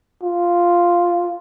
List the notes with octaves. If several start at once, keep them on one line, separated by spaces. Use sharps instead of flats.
F4